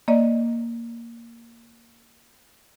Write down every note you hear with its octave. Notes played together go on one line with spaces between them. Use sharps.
A#3 D5 D#5